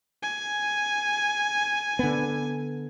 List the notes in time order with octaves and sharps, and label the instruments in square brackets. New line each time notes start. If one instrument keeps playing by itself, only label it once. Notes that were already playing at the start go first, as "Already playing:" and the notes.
[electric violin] G#5
[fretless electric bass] D3 B3